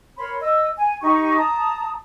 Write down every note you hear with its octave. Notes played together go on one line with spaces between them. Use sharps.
A#4 C#5 B5 C6
D#5 E6
G#5
D#4 G4 C#6
A5 A#5 D#6